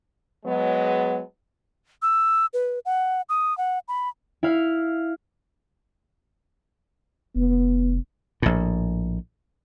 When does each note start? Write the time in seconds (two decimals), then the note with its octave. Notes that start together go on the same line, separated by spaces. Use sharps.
0.46 F#3 G#3 B3
2.02 E6
2.53 B4
2.86 F#5
3.29 D#6
3.58 F#5
3.88 B5
4.43 E4 F5
7.36 F1 B3
8.42 A#1 A2